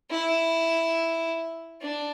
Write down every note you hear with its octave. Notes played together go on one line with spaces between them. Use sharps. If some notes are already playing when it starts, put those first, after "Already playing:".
E4
D4